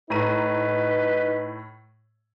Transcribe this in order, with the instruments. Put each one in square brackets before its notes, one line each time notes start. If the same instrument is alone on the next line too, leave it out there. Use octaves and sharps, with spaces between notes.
[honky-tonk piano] A2 A#5 D#7 [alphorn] D#4 [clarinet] B4